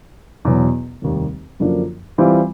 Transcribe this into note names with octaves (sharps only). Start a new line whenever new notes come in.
E2 B2 F#3
F1 D#2 D#3 G3
F#2 D3 F3 A#3 D4
E3 G3 C4 F4